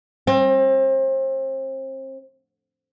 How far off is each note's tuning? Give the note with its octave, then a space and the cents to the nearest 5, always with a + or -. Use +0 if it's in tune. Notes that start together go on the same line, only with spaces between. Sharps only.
C4 +35